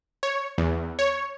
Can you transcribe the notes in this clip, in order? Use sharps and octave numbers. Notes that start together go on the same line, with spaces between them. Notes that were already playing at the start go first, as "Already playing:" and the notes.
C#5
E2
C#5